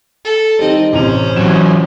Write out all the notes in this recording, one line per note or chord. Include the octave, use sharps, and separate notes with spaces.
A4
D#3 G3 C4 D#5
A1 C3 C#4 C5 F7
E3 F#3 E7